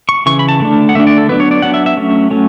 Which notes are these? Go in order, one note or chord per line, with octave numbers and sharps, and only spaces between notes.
C#6
C#3 E3 C#6
B5
A5
D3 A3 D4
F#5
D3 A3 D4 E5
D5
A4
F#3 B3 D4 B4
C#5
D5
F#3 B3 D4 F#5
E5
E5
F#3 A3 C#4
F#3 A3 C#4